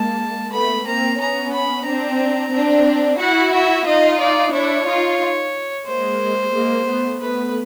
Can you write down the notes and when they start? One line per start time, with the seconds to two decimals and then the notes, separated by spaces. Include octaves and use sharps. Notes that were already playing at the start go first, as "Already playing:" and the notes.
Already playing: G#3 A#3 A5
0.52 A3 B3 B5
0.86 A#3 C4 A#5
1.19 B3 C#4 A#5
1.53 B5
1.86 C4 D4 A#5
2.53 C4 D4
3.20 E4 F#4 F#5
3.54 E5
3.86 D#4 F4 D#5
4.20 D5
4.53 D4 E4 C#5
4.87 D#4 F4
5.87 G#3 A#3 C5
6.54 G#3 A#3
6.87 A3 B3
7.20 A3 B3 B4